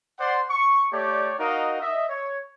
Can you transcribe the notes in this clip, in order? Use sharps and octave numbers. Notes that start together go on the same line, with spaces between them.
C5 D5 F#5 C6
C#6
A3 G4 C#5 D5
D#4 F#4 A#4 D#5 F5
D#5 E5
C#5